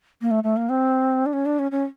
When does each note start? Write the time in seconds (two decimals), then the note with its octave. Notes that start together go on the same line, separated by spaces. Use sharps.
0.22 A#3
0.31 A3
0.44 A3
0.57 A#3
0.69 C4
1.26 D4
1.33 C#4
1.46 D4
1.59 C#4
1.72 C#4